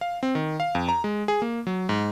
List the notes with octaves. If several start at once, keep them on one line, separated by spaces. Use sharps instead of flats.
F5
C4
D#3
F5
F2
A#5
G#3
G#4
A#3
F#3
G#2